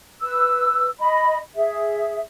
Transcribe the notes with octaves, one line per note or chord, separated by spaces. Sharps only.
B4 E6
D#5 B5
G#4 E5